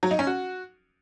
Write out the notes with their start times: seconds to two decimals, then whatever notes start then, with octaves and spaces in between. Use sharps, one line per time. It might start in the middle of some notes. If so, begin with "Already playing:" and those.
0.03 F#3
0.11 D#4
0.19 C#4
0.27 F#4